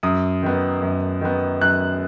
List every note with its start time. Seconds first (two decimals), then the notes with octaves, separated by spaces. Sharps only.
0.03 F#2 D#6
0.43 D#3 B3
0.82 F#2
1.21 D#3 B3
1.61 F#2 F#6